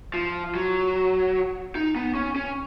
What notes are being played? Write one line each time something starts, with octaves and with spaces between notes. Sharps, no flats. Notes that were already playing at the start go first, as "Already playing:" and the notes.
F3
F#3
D#4
B3
C#4
C#4